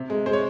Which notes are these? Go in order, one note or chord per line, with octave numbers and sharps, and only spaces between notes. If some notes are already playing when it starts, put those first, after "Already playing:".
Already playing: C3
G#3
G#3 C5
C#5